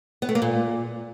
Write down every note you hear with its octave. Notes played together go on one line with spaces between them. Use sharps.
B3
A3
A#3
A#2